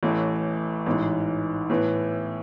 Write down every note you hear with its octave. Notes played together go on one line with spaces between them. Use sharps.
A1 A2 E3 A3
A1 G#2 E3
A2 E3 B3